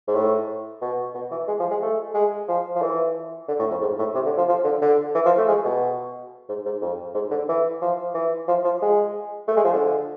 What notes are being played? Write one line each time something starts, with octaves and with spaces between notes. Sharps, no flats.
G#2
A2
B2
B2
E3
G#3
F3
G#3
A3
G#3
F3
F3
E3
D3
A2
F2
G#2
A2
C3
D3
F3
F3
D3
D3
E3
F3
A3
G#3
B2
G#2
G#2
F2
G#2
D3
E3
F3
E3
F3
F3
G#3
A3
G#3
F3
D3